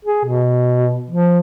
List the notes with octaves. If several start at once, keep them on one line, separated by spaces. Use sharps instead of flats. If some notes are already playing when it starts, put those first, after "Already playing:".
G#4
B2
F3